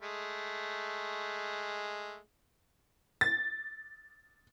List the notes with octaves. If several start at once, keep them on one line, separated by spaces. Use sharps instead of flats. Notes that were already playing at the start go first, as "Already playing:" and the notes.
G#3 A3
A6